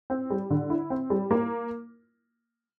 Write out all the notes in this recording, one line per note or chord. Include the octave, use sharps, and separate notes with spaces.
C4
G3
D3
E4
C4
G3
A#3